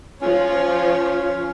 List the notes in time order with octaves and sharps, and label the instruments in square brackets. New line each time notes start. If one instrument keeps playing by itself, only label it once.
[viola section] F3 F4 C#5 [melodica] C#4